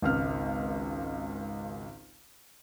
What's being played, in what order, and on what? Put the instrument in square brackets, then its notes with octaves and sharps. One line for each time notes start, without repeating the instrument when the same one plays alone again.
[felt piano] G#1 C#2 F6